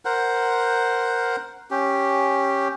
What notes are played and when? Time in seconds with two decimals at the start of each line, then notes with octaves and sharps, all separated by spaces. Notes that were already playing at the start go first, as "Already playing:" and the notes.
0.05 A#4 C5 F#5
1.71 C#4 G4